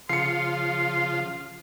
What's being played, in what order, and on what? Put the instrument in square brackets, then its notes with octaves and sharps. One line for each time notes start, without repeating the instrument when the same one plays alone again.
[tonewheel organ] C#3 [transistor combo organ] F3 F4 [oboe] C6 [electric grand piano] C7 C#7